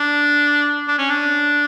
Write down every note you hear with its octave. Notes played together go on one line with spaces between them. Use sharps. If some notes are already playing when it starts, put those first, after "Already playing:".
Already playing: D4
D4
C#4
D4